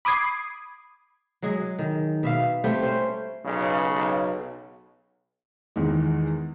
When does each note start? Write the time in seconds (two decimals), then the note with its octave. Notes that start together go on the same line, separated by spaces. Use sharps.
0.05 B5 D6 D#6 G#6 C7
1.42 F#3 G#3 G#4
1.79 D#3
2.23 B2 E5 F5
2.64 G3 A3 C4 G5
2.83 C#4 C5
3.45 B1 C#3
5.76 E2 D#3 G#3